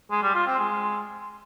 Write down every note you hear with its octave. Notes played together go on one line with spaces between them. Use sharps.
G#3
G3
F4
C4
G#3